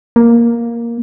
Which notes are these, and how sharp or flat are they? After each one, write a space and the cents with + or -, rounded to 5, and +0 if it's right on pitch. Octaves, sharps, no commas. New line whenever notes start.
A#3 +5